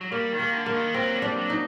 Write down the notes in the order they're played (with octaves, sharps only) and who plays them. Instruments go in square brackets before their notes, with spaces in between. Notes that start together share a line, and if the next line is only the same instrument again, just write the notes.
[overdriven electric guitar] F#3
[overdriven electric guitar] G3 [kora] A#3
[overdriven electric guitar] D#3
[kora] A#3
[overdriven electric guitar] D3
[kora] A#3
[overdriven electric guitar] D#3
[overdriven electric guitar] F#3 [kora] C4
[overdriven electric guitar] G3
[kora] D4
[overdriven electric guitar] F#3
[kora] D#4